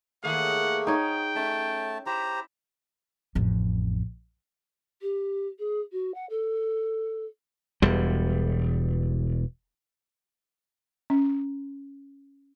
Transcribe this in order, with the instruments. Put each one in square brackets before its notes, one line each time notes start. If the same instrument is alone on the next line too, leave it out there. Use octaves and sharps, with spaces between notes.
[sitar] D#2 D#3 G#4 [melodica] A3 A#3 [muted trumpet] F#5
[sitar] G#2 [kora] D#4 C#5 [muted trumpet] G5
[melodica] A3 A5 [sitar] C#4
[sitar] E4 [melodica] G4 C5 A#5
[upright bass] A1 F2
[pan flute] G4
G#4
F#4
F#5
A4
[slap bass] E1 E2 G3
[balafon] C#4